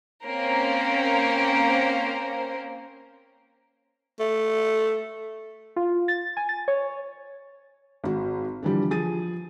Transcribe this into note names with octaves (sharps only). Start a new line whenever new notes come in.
A#3 C4 C#4 A#4 C5
A3
F4
A6
G#5
A6
C#5
G#1 F#4
D3 E3 F3 G3 G4
F3 G#4 A6 D#7